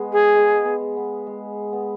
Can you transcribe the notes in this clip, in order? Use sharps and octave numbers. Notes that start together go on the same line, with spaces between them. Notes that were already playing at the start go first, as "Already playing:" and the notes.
Already playing: G#3 B3
G#4
G#3
B3
B3
G#3
B3